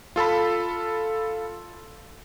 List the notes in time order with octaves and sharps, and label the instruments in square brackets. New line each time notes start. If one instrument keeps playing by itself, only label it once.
[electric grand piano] F4 A4 A5 B5